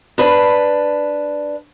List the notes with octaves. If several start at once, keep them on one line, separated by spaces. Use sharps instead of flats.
D4 B4